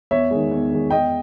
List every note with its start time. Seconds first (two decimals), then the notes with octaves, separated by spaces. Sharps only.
0.11 E2 C#5 E5
0.31 D#3 G#3
0.51 E2
0.71 D#3 G#3
0.90 E2 D#5 G5